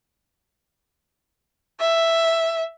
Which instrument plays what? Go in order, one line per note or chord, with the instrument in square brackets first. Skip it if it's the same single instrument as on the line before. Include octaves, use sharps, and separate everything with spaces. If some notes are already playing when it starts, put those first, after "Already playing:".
[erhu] E5